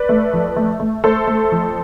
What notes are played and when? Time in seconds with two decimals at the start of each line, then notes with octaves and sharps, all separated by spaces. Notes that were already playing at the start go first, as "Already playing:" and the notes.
Already playing: B4 D5
0.09 A3
0.33 F2
0.56 A3
0.80 A3
1.04 A3 A4 C5
1.27 A3
1.51 F2